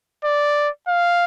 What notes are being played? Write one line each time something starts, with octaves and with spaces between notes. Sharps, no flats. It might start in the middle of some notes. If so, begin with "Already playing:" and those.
D5
F5